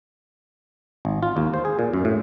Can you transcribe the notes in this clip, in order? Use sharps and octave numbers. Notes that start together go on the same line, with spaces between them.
G#1
F4
D#2
C5
G#4
A#2
F#2
A2